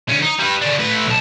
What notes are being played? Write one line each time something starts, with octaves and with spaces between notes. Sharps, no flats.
D3 C#4
D#4
G3 B4
C#3 D4
A3 B4
B1 A5